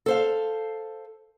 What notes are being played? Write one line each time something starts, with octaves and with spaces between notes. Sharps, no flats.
A4 C5 F5